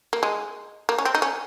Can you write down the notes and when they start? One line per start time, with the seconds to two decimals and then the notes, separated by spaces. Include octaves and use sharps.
0.13 A#3
0.23 G#3
0.89 A#3
0.98 C#4
1.05 C4
1.15 D#4
1.22 C#4